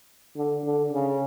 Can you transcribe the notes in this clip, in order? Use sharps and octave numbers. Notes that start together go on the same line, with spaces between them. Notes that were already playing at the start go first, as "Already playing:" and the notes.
D3
D3
C#3